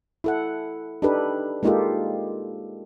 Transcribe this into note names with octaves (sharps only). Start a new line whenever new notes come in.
E4 A4 F#5
D4 D#4 G4 A4 B4
G#3 A#3 D#4 F4 G4 A4